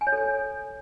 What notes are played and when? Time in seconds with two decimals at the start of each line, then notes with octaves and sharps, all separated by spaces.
0.01 G#5
0.07 C#5
0.12 A4